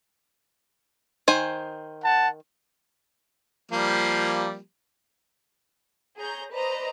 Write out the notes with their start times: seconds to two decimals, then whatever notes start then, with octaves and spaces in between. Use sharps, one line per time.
1.28 D#3 C5 G#5
2.04 F#5 A5
3.71 F3 G3 A#3
6.19 G#4 C#5 A#5 G6
6.54 B4 C5 D5 D#5 A#5